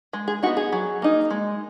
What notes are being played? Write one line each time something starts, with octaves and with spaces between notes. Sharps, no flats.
G#3
G#4
B3 D#4 F#4
G#4
F#3
A#3 D#4
G#3